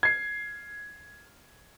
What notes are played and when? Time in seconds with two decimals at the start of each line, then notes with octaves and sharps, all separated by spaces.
0.03 G#6 C7